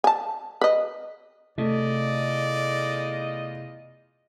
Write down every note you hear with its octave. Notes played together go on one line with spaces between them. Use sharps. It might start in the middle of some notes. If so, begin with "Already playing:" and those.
G#5 A5
B4 D#5
E2 C3 A3 F4 D5 D#5